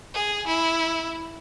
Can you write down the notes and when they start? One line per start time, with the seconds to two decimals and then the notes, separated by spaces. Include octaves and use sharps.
0.14 G#4
0.47 E4